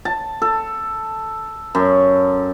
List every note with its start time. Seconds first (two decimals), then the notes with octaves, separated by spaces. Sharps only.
0.05 A5
0.42 A4
1.75 F#2